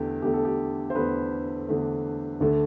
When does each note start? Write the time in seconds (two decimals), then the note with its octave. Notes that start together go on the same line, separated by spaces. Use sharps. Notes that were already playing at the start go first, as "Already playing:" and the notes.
Already playing: E2 D3 A3 G4
0.22 E2 D3 A3 G4
0.34 A4
0.45 G4
0.90 C5
0.95 E2 D3 A3 B4
1.68 E2 D3 A3
2.41 D2 D3 A3